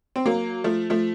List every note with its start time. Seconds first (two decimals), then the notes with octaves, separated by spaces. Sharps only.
0.16 C4
0.26 F#3 A#3
0.64 F3 A3
0.90 F3 A3